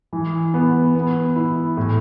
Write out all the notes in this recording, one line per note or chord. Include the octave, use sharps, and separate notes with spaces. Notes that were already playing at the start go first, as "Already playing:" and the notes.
E3
B3
B3
E4
A2